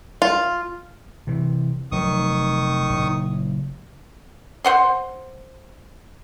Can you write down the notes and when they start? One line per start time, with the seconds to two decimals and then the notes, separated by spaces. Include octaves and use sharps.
0.22 F4
1.27 C3 E3
1.92 F1 D#3 F#3 C#6 D#6
2.89 F#1 A#2
4.65 C5 F#5 C6